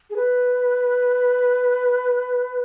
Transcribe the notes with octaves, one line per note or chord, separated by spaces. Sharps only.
G#4
B4